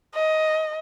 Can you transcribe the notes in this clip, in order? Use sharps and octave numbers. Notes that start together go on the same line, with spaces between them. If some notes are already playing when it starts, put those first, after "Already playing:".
D#5